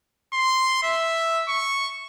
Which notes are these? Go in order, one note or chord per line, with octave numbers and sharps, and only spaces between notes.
C6
E5
C#6